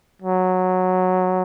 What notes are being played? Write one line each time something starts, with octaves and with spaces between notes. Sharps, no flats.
F#3